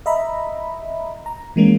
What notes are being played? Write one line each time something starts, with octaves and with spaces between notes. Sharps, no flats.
D#5 E5 A#5 B5
A#5
E3 G#3 A#3 C#4